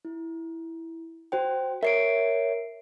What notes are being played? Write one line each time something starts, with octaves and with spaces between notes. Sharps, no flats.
E4
F#4 C5 G5
A#4 C#5 E5 C7 D7